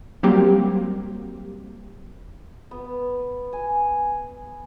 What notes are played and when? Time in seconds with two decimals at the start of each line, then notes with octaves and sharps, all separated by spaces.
0.23 F#3 G3 A#3 C4 G4
2.71 B3
3.53 G#5